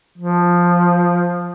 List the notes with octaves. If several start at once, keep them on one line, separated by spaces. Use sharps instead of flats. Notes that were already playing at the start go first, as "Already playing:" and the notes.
F3